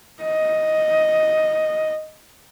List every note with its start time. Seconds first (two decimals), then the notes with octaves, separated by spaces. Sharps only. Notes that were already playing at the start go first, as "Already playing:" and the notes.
0.23 D#5